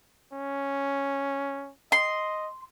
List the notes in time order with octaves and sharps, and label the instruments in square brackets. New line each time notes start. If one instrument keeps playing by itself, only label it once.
[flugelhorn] C#4
[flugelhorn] D#5 [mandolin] C6